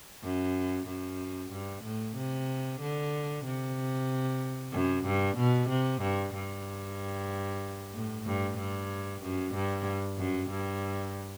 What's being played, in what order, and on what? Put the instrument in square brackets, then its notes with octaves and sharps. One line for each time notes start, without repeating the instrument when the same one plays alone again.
[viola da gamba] F#2
F#2
G2
A2
C3
D3
C3
F#2
G2
B2
C3
G2
G2
A2
G2
G2
F#2
G2
F#2
G2